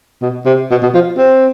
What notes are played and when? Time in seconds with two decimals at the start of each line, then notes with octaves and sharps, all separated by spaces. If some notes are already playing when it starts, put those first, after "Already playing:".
0.22 B2
0.45 C3
0.71 B2
0.83 B2
0.94 F3
1.18 C4